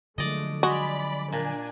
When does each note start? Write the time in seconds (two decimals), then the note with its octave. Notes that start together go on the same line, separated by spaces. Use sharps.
0.18 D3 F3 F#3 G#3 A3 D5 D#5
0.63 G#3 F#4 D5 B5
1.32 A#2 D4 G#5